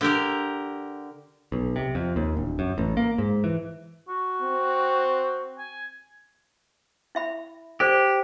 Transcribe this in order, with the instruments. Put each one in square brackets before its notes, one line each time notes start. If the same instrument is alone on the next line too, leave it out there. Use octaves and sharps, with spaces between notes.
[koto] D3 G4 A#4
[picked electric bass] B1
C3
F2
D#2
D1
F#2
A1
A#3
G#2
E3
[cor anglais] F#4
[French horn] C4
[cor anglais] G#5
[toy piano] E4 E5 B5
[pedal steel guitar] G4 [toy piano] A4 C5 D5